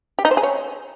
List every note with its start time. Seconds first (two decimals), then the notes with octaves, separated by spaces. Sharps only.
0.19 G4
0.25 D#4
0.31 C5
0.37 G#4
0.43 C#5